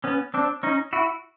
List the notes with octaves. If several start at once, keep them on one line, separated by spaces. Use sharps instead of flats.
B3 C#4
C4 D4
C#4 D#4
E4 F#4